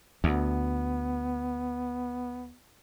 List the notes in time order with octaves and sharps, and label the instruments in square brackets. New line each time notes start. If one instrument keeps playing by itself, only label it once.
[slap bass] D2 [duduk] B3